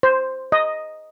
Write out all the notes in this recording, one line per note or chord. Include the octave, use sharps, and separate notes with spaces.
C5
D#5